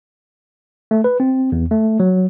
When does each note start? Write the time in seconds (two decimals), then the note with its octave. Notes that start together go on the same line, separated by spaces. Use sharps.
0.91 A3
1.04 B4
1.20 C4
1.52 E2
1.71 A3
2.00 F#3